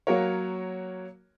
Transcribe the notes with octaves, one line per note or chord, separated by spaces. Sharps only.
F#3 A#3 F#4 A#4 C#5